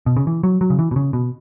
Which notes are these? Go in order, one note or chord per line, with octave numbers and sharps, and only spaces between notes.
B2
C#3
E3
F#3
F#3
C#3
E3
B2
C#3
B2